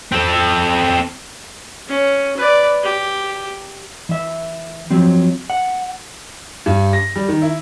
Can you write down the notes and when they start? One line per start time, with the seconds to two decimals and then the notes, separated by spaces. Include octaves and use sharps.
0.12 C4 A4
1.88 C#4
2.37 B4 D5
2.83 G4
4.09 E3 E5
4.90 F3 F#3 C4
5.50 F#5
6.66 G2
6.93 A#6
7.16 G3
7.29 D#3
7.42 E4